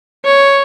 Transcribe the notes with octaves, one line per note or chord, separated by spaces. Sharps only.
C#5